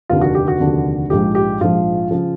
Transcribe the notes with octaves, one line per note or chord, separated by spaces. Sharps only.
F1 D#2 D3 F4
F#4
G4
F#4
F1 D#2 D3
A#1 G#2 F3 G4
G4
A#1 G#2 F3 F4
C#3 F3